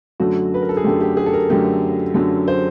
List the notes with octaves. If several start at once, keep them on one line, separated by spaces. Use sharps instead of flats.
F#2 D3 F#3 A3 F#4
B4
A#4
A4
G#4
F#2 D3 F#3 A3 G4
G4
G#4
A4
A#4
F#2 D3 F#3 A3 G4
F#2 D3 F#3 A3
C5